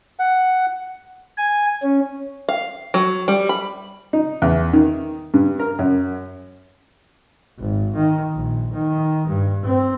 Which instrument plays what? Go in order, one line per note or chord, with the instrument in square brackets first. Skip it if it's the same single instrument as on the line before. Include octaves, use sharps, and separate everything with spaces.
[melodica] F#5
[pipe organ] G#5
C#4
[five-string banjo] F5
F#3
G3
B5
[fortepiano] D#4
E2
D#3
G2
A#4
F#2
[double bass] G#1
D#3
A#1
D#3
G2
C4